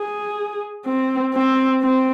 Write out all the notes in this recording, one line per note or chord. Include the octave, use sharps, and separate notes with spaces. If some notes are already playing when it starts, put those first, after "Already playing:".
Already playing: G#4
C4
C4
C4